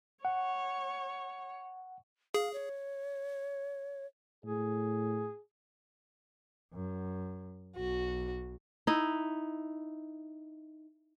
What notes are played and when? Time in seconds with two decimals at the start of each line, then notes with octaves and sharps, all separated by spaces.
0.25 C#5 F#5
2.34 G#4 F5
2.53 C#5
4.44 A2 G#4
6.74 F#2
7.76 B1 F#4
8.87 D#4 E4